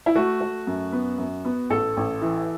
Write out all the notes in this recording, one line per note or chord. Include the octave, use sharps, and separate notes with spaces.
E4
A3 F#4
A3
F#2
B3
F#2
B3
A1 A4
A1
E3